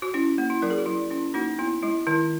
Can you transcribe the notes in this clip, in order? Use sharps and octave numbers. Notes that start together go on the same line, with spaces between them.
F#4
C#4 E4
A#3
E4
F#3 A#4
G#4
F#4
F#3 E4
C#4 E4
A#3 D#4 F#4
B3 E4
G#3 E4
D#3 E4